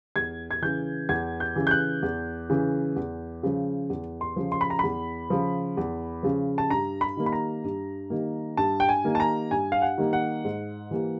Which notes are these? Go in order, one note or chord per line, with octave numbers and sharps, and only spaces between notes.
E2 G#6
G#6
C#3 E3 G6
E2 G#6
G6
C#3 E3
G6
F#6
E2
C#3 E3
E2
C#3 F3
E2
C6
C#3 F3
C6
B5
A#5
E2 B5
C#3 F3
E2
C#3 F3
A5
G2 A#5
B5
D#3 G3 A#3
B5
A#5
G2
D#3 G3 A#3
G2 A5
G5
G#5
D#3 G3 A#3
A5
A#5
G2 G#5
F5
F#5
D#3 G3 A#3
F#5
G#2
E3 G3 A#3